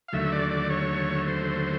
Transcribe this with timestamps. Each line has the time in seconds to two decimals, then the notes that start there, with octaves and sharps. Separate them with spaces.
0.08 F5
0.13 D#2 D3 F#3 A3 E5
0.32 D5
0.51 D5
0.70 C#5
1.28 C5